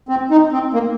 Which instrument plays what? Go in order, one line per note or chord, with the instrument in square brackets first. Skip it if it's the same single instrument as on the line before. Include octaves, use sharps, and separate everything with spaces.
[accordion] C4
D#4
C4
A#3